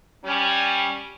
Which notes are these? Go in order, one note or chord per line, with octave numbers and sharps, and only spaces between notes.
G3 C#4